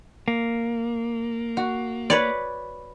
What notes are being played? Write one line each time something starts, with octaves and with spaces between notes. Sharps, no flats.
A#3
F#4
B4 C#5 D5